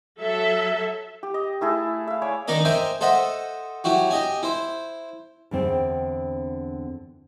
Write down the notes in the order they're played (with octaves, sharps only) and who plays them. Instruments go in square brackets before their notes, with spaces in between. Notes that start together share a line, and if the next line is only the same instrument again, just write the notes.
[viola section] F#3 A4 E5
[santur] G4
D#5
A3 E4 G#4 A4
E5 F5
C#5 D5 G#5 D6
[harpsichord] D#3 D4 D#4 A#4 D#5
A#4 C5 D#5 E5 G5 G#5
A4 C5 D#5 E5 F#5
F#3 E4 F#4 G4
G4 D#5 G#5
E4 C5
[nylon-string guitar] E2 D3 C4 C5 G5